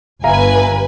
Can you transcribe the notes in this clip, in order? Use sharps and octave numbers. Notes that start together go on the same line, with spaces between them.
G1 B4 E5 F5 G#5 A#5